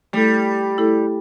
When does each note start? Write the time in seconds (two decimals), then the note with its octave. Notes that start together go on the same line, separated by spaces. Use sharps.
0.13 G3 A3 E4 A4
0.78 A3 E4 A4